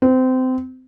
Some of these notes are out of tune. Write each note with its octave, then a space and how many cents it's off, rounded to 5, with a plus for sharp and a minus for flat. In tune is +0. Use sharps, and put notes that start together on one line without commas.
C4 -25